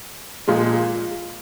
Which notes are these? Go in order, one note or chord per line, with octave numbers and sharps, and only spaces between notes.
A#2 F3 G#3